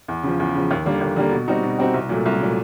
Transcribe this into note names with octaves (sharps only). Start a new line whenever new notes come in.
E2
C#3 F3
E2
C#3 F3
D#2
D3 G3 A#3
D#2
D3 G3 A#3
B2
G3 C4 D#4 F#4
B2
G3 C4 D#4 F#4
C2
A#2 F#3 A3
C2
A#2 F#3 A3